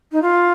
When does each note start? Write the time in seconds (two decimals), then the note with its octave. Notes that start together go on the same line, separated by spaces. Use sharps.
0.12 D#4
0.22 F4